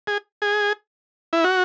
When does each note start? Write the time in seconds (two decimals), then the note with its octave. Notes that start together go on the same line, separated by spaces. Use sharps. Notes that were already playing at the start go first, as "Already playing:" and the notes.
0.07 G#4
0.42 G#4
1.33 E4
1.44 F#4